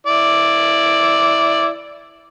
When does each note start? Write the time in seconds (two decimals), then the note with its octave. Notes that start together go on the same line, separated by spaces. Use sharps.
0.07 E4 D5